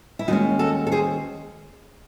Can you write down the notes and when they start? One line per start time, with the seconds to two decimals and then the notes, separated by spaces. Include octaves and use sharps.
0.19 E4
0.28 D#2 D#3 G#3 C#4 D#4 F#4
0.59 F#4 A4
0.87 A4
0.92 G#4 C5